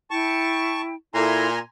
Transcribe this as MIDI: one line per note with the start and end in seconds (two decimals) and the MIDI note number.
0.11 0.95 64
0.11 0.95 79
0.11 0.81 81
0.11 0.81 85
1.14 1.59 46
1.14 1.48 64
1.14 1.48 69
1.14 1.48 76
1.14 1.59 80
1.14 1.59 82
1.14 1.59 84